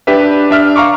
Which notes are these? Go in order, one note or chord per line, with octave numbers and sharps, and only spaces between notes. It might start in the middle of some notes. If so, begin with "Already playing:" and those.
D4 G4 B4 E5
D4 E5 F6
F5 A#5 C#6 D6